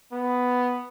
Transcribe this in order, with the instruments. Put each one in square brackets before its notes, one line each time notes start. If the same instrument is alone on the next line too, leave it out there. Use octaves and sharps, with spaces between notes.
[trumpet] B3